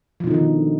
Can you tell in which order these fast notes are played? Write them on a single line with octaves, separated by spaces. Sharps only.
F3 B2 D#4 D3 D#3